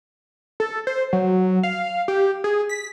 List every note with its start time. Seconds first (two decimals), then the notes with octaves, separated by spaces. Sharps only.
0.60 A4
0.87 C5
1.13 F#3
1.63 F5
2.08 G4
2.44 G#4
2.69 B6